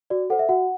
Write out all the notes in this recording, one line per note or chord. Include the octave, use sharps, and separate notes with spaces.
F#4 D5
A4 C5 F#5
E5
F#4 F#5